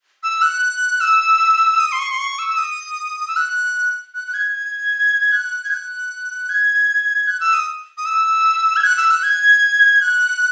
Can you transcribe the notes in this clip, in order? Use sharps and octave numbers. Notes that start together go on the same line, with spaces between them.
E6
F#6
E6
D#6
C6
C#6
C6
C#6
E6
E6
D#6
D#6
E6
F#6
F#6
F#6
G#6
G#6
F#6
G#6
F#6
G#6
F#6
E6
D#6
D#6
E6
G#6
F#6
E6
F#6
G#6
F#6